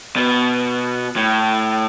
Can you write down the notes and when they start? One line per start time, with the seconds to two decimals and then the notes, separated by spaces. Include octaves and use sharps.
0.16 B2
1.16 A2